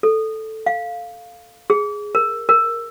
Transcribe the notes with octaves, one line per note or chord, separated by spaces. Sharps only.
A4
F5
G#4
A#4
A#4